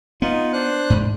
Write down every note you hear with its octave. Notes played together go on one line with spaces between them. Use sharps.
B3 D#4 F4
D4 C5 F#6
G#2